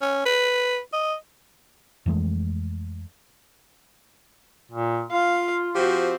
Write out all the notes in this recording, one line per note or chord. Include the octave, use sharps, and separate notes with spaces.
C#4
B4
D#5
F2 E3 G#3 A3
A#2
F4 F5
F3 C4 F#4 G4